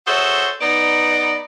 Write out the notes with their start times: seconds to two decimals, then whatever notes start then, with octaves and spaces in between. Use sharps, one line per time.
0.07 F#4 G#4 A4 C5 C#5 E5
0.61 B3 D#4 D5